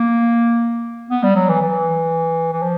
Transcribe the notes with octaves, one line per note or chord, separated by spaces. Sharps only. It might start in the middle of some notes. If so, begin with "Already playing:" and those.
Already playing: A#3
B3
G3
F#3
E3
E3
E3
F3